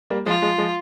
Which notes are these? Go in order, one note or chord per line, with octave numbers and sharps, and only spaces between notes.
G3 A#3
F3 G#3 F4
F3 G#3
F3 G#3